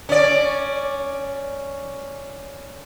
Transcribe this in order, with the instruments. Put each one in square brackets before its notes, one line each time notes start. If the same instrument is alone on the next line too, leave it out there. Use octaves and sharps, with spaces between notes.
[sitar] C#4 D5